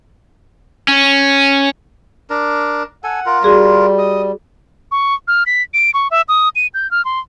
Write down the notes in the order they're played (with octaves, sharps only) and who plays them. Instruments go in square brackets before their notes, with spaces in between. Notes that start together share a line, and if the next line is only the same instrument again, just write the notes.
[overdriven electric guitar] C#4
[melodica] D4 A#4
[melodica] A4 G#5 [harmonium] F#5
[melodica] F4 A#4
[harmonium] G3 [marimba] F#4 G#4 C6
[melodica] D#5
[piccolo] C#6
F6
B6
D7
C#6
E5
D#6
D#7
G6
F6
C6